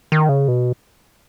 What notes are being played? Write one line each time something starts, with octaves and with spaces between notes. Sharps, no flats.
D#3
C#3
B2